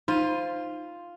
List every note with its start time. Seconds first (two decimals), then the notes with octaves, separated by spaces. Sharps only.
0.08 D#4 F4 C5 D#7